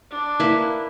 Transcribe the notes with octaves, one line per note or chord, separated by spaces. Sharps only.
D4
A#3 E4 B4